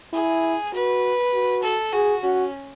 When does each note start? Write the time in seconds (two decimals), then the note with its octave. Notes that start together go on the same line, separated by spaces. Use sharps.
0.13 E4 G#4
0.73 F#4 B4
1.34 F#4
1.63 A4
1.93 F#4 G#4
2.23 C#4 F#4